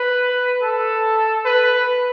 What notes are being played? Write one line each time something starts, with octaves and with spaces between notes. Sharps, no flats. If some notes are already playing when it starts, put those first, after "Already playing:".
Already playing: B4
A4
B4